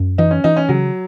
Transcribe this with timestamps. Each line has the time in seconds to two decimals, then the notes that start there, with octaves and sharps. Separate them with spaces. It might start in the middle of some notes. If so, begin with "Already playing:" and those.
Already playing: F#2
0.18 E3 D#4
0.31 C#4
0.44 E3 D#4
0.57 C#4
0.69 C#3 F#3